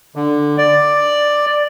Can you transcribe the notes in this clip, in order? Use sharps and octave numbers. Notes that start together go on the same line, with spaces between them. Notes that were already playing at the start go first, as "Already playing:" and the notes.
D3
D5